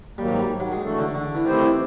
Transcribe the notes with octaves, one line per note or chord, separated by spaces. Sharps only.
G#2 D#3 F#3 G3 A#3
G3
G3
F#3
G#3
E3 A3 D4 F#4 A4
D3
D3
E3
D#3 A3 C4 E4 G4 C5
E3